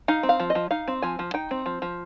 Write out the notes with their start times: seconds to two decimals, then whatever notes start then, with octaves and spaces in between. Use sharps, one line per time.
0.08 D#4 F5
0.23 C4
0.29 F5
0.40 F3
0.50 D#5
0.55 F3
0.71 D#4 F5
0.88 C4
1.02 F3 G#5
1.19 F3
1.34 D#4 G5
1.51 C4
1.66 F3
1.82 F3